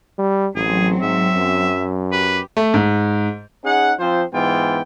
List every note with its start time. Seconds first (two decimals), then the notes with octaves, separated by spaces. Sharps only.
0.18 G3
0.55 A1 F#3 C4 G#4
1.02 G#2 E5
1.37 F#2
2.12 G4 B4
2.57 A3
2.74 G#2
3.63 C#4 D#4 G#4 F#5
3.99 F3 C4 F4 C5
4.32 G#2 E3 B3 F4 G5